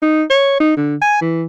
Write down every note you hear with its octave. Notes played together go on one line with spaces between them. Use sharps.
D#4
C#5
D#4
D3
G#5
E3